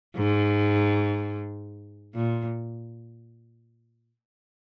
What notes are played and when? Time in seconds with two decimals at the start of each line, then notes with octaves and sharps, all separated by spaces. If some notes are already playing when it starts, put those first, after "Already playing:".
0.17 G#2
2.15 A#2